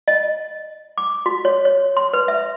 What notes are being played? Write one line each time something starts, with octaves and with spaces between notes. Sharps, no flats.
D#5
D6
F#4
C#5
C#5
C6
B4
E5